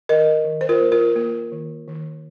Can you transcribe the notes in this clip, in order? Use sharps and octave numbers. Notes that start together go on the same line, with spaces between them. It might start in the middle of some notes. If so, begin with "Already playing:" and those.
D#3 A#4 D#5
D#3
C5
F4 A#4
A#3
F4 A#4
A#3 F4
D#3
D#3